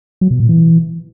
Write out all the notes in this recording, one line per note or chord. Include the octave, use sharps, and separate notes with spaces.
F#3
B2
A#2
E3